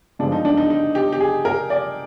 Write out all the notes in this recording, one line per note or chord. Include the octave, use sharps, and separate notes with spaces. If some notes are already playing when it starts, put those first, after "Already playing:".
G2 D3 F3 G#3 C4 D4
D#4
D4
D#4
D#4
G4
G4
G#4
A#4
D5